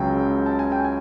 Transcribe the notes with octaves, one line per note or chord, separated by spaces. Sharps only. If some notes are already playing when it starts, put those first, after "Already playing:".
Already playing: C#2 C#3 F#3 G5
A5
G#5
G5
G#5